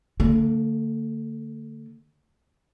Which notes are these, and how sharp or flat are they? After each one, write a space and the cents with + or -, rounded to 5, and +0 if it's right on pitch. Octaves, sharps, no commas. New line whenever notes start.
D3 -10 A3 +40